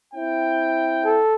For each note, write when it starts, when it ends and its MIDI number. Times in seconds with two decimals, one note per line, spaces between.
0.14 1.19 60
0.14 1.19 64
0.14 1.19 79
1.05 1.36 69